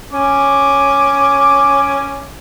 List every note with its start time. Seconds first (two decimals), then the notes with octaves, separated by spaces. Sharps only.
0.13 C#4 D6